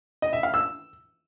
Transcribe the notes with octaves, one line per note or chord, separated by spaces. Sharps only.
D#5
E5
F5
E6